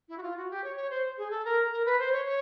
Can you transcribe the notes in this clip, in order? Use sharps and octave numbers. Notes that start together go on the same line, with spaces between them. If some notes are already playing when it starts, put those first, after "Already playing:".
E4
F#4
F4
F#4
G4
C#5
C#5
C5
G#4
A4
A#4
A#4
B4
C5
C#5
C#5